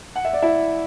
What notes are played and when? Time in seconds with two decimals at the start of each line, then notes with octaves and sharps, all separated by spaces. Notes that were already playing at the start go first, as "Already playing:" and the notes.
0.16 F#5
0.25 E5
0.33 D5
0.42 E4 E5